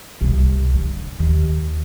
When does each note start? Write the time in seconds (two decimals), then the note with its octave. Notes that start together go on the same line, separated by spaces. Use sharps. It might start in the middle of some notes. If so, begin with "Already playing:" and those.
0.21 C2
0.74 D3
1.19 D#2